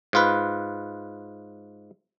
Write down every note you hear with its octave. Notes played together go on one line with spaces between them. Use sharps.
G#2 F4 B4